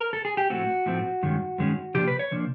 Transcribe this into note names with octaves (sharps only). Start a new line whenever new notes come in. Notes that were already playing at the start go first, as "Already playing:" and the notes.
A#4
A4
G#4
G4
A2 F3 A3 C4 F#4
A2 F3 A3 C4
G2 D#3 G#3 C#4
G2 D#3 G#3 C#4
C3 F3 A#3 D4 G4
B4
C#5
C3 F3 A#3 D4